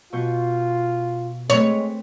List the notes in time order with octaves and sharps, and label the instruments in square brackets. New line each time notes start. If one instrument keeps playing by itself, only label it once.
[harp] B2 C#6 G6 [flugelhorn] F4
[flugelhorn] G#3 [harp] A3 C4 B4 [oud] C#5